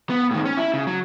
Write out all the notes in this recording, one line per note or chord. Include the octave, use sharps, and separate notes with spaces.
B3
A2 D#3
C#4
E4
C#3
F#3